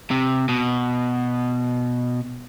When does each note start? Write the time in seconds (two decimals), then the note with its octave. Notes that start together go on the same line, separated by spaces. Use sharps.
0.11 C3
0.49 B2